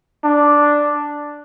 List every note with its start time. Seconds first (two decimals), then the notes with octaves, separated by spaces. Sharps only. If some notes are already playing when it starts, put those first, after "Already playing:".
0.24 D4